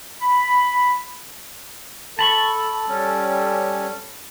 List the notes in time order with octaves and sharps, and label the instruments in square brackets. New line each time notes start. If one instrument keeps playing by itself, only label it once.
[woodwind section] B5
[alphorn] A4 [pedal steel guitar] A5 B5 C#6
[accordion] G3 C#4